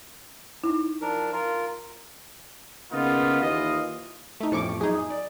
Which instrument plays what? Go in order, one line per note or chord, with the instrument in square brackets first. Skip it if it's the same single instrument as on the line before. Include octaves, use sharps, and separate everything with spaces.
[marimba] D#4 E4
[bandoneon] F3 D4 A#4
F4 A#4
[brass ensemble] C#3 A#3 B3 D#4 F4
D#2 E3 F4 D#5
[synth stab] A3 D#4
[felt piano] A1 F2 F3 [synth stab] A2 C#6 D6
[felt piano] F#2 [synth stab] D#4 G#4
[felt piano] D#6
D5